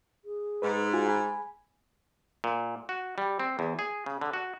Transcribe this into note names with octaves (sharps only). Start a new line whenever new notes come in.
G#4
G#2 B4
F4 F#4 G#5
G#5 B5
A#2
F#4
G3
C4
E2
G#4
C#3
D3
F#4